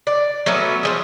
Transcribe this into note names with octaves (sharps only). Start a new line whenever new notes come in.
D5
F#3 A3 B3 C#4
F3 F#3 G#4